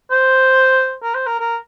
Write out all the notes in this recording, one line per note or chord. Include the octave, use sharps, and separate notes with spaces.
C5
A#4
C5
A#4
A#4